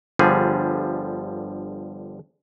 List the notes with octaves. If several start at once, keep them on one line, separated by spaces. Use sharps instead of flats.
G1 D3 F3 G3 G#4